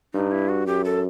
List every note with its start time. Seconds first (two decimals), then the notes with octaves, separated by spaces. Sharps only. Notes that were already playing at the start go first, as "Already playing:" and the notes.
0.14 G2 D#4
0.31 E4
0.49 F#4
0.67 F#2 G4
0.85 A4